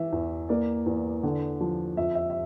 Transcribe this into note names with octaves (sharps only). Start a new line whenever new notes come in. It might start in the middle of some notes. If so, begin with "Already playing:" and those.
Already playing: E3 E5
E2
A#3 D5
E2
D3
F3
F2 E5
E5
E5